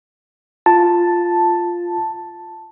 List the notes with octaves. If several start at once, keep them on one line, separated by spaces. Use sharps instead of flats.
F4 A5